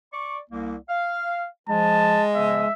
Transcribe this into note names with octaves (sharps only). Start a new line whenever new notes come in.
D5 C#6
C2 A#3
F5
F3 G#3 A5
C#3 F3 B3 E5